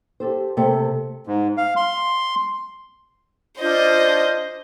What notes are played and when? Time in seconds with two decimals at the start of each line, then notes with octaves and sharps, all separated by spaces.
0.20 G4 A4 C5
0.57 C3 A3 A4 C5
1.27 G#2
1.57 F5
1.76 C6
3.60 D4 F4 C5 D#5 G6